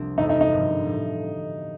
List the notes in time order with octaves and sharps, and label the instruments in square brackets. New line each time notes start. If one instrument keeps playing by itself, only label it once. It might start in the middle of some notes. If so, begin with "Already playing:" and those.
Already playing: [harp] F1 C2 F3 C4 D4
[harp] G1 F2 C3 E3 A3 [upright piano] D#4
[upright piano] D#4
D#4
[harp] G#1 G2 D3 F3
A2 F3